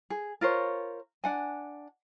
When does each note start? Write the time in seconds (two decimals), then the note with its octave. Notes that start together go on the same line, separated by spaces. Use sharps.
0.10 G#4
0.41 F4 A#4 C5 C#5
1.24 D4 F#5 G#5